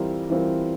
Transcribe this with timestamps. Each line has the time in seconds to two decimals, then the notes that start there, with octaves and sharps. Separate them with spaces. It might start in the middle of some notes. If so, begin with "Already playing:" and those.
Already playing: E3 G3 C4 F4 A#4
0.30 E3 G3 C4 F4 A#4